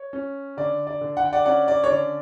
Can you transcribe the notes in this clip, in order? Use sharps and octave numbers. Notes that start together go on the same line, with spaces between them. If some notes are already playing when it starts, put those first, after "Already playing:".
Already playing: C#5
C#4
D3 D5
D5
D3
F#5
G5
D5 F#5
C#4 D5 F#5
D5
C#5
D3 D5